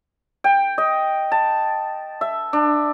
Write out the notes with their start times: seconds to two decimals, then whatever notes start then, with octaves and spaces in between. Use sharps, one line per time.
0.44 G5
0.78 D#5
1.32 A5
2.21 E5
2.53 D4